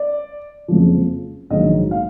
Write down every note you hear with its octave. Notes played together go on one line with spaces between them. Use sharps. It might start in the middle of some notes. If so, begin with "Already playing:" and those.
Already playing: D5
F#1 F2 F3
A#1 G#2 D#3 F#3 D#5
F5